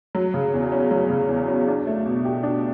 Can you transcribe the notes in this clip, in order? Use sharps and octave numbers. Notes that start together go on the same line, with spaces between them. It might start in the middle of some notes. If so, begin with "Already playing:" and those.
F#3
C#3
E2
C#4
F#3
C#3
E2
C#4
D4
A3
B2
G4
D4